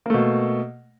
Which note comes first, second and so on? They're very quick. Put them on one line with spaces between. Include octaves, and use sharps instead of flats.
A#3 A3 B2